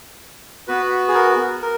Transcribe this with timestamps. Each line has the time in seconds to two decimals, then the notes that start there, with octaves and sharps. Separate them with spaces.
0.68 B3 F#4 B4
1.08 G#4
1.14 A#4
1.62 A#4